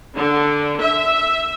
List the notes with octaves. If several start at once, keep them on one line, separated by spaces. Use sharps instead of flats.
D3
E5